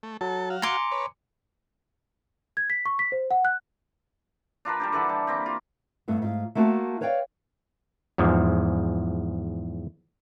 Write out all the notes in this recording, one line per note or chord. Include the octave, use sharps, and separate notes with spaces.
A3
F#3 A4 A5
F#4 F5
G#5 A#5 C6 D6 C#7
B4 C#5
G#6
B6
C#6
B6
C5
F#5
F#6
D4 F4 A#4 B4
G3 D4 G4
D3 E3 A4 F#5
G3
A#3 C4 G4
F4
G2 A3 B3
G#2 F4
A3 A#3 F4 F#4 A5
B4 C#5 D5 F5 G5
E2 G#2 F3